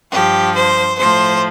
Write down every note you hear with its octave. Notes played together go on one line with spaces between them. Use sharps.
G2 F3 G4
C5
A2 F3 C5